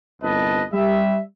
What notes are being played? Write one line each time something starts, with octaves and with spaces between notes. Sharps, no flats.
G1 C2 B4 D#5 A5
G3 E5